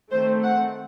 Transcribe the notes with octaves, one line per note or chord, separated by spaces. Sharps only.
D#3 A3 C4 C5
F#5